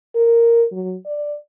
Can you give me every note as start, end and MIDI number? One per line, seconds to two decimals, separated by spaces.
0.15 0.64 70
0.72 0.96 54
1.06 1.35 74